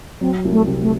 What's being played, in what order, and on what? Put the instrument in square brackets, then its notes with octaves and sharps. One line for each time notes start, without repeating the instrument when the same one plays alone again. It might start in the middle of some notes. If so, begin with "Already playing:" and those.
[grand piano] F#3 [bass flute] C4
[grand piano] C2
[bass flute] A3
[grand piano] C3
[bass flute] A3